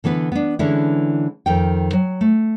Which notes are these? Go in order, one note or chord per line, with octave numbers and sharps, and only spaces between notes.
D3 E3 B3 B4
B3 D4
D3 E3 G#3 C#4 D4 E4
F2 D#3 G5
F#3
A3